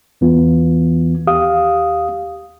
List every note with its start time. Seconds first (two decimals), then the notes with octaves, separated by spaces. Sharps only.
0.21 E2 E3 B3 F4
1.27 D#2 G4 F5 D#6